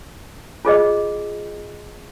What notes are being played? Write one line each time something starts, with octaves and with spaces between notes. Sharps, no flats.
F4 G#4 D#5